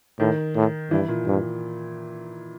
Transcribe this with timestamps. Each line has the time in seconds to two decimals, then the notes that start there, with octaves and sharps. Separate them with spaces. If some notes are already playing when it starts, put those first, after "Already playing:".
0.19 A2 D#3
0.55 A2
0.91 G2 E3
1.09 A#2
1.26 G2